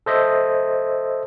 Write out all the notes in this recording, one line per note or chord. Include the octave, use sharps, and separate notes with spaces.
A4 C5 D#5 E5